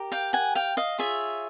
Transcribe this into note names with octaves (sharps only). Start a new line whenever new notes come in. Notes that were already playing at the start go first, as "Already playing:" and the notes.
Already playing: G4 A#4
F5 G5
F#5 G#5
F5 G5
D#5 F5
F4 G#4 C#5 E5